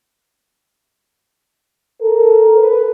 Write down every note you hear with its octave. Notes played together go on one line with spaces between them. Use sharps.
A4 A#4
B4